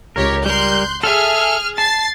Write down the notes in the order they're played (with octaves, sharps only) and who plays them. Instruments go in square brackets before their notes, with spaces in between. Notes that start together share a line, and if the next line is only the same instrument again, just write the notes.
[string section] C#2 G4 C#5 [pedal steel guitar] A#4
[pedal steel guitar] G3 A#4 [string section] C6 F#6 G6
[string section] G#4 F6 [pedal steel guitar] A4 E5
[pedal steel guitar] A5 [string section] A6 C7